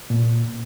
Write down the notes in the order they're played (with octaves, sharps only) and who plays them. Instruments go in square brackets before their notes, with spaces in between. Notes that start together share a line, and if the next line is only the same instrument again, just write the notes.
[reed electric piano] A#2